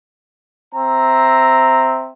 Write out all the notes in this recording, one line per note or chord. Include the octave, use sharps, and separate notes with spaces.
C4 E5 A#5